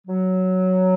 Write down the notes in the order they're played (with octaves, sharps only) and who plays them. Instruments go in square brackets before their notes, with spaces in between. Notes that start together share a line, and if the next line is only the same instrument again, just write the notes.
[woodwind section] F#3